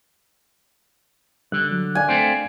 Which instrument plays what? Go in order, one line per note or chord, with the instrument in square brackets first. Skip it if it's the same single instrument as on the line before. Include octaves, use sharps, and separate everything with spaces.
[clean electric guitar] D3 [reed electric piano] G3 F#6
[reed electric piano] F#3
[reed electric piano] D4 D5 F5 [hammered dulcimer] G#5
[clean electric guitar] A3 C4